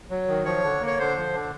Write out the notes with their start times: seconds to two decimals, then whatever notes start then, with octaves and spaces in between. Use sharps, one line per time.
0.10 F#3
0.28 D#3
0.45 F3 C#5
0.63 D3
0.81 A#3
0.87 C#5
0.99 D3 C5
1.17 F3
1.34 D3